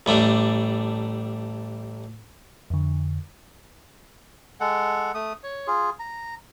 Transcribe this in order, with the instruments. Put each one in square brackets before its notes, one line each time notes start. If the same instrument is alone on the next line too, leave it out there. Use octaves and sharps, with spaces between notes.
[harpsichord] A1 G3 A3 D4
[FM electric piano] F2 D3
[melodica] G#3 A4 F#5
A3 D#6
C#5
F4 G#4
A#5